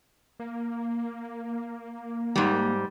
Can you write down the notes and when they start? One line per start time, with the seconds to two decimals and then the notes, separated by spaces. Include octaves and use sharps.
0.40 A#3
2.36 G#2 G3